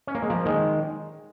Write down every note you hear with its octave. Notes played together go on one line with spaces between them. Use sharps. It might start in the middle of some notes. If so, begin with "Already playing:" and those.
C#4
A#3
G#3
F3 A#3
D#3 G#3